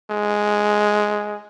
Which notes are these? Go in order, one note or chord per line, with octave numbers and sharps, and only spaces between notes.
G#3